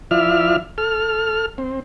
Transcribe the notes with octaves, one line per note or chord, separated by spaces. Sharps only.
F3 E4 D5 E5 F6
A4 F6
C4